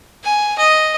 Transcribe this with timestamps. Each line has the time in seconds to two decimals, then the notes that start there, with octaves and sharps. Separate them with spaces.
0.23 G#5
0.58 D#5